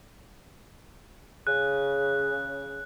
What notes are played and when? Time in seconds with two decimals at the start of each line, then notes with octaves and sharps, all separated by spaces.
1.47 C#3 F#6